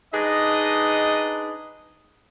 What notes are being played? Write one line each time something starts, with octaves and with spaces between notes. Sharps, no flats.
D4 D#4 G#4 B4 D#5